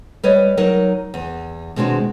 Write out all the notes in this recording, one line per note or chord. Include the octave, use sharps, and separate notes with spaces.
G3 B4 C#5 D#5
F#3 D#4 A#4
E2
B2 D#3 G#3 C4 D4 F#4